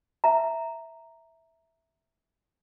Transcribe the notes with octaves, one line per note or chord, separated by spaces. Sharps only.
E5 A#5